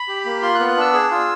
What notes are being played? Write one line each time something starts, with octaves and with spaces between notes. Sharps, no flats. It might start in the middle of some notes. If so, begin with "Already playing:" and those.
Already playing: B5
G4
A#3
F4 C6
F#6
B3
F#6
D4 E6
G#4
F4